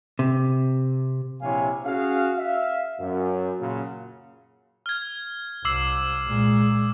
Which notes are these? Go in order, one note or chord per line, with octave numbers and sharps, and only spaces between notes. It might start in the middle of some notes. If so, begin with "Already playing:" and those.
C3
A#1 C3 E4 C#5 F5 G#5
C#4 F#4 G#4 F5
E5 F5
F#2
A#2 C#3 F#3 F4
F6 G#6
C2 D6 E6 C7
A#2 G#3